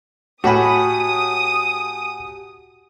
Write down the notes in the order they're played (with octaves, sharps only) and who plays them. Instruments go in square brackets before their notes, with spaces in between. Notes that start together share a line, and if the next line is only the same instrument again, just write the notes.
[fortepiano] A2 B5 [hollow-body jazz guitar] F#4 [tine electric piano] G4 F#5 G#5 [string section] D#6